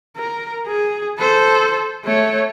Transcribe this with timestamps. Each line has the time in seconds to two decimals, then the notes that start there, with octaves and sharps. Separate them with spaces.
0.17 A#4
0.67 G#4
1.19 A4 C5
2.05 A3 C#5